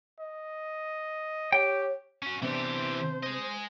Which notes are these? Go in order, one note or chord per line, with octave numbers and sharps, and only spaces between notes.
D#5
G4 C#5 G5
C#4 F#4
C3 E3 B3 D4 G4 C5
G#4 D#5